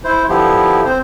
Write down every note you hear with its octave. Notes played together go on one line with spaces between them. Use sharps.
E4 C5
D3 F3 B3 E4 G4
C4 C5